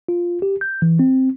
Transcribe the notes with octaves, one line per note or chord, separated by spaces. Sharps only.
F4
G4
G6
E3
C4